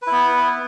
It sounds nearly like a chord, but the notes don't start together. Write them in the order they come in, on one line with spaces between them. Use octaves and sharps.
B4 E4 B3